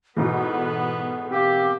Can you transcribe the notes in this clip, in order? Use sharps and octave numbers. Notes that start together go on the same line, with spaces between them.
E2 G#2 B2 B3 A4
A#3 C4 G4